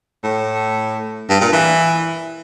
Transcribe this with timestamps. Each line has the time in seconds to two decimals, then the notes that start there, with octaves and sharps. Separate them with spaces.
0.23 A2
1.29 G2
1.41 A#2
1.52 E3